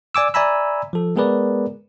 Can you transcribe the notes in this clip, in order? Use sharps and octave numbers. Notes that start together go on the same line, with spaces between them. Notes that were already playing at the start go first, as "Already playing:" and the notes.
D5 G#5 D6 E6
D5 E5 G#5 A#5 B5 E6
F3 A4
G#3 B3 G#4 A#4 B4 D5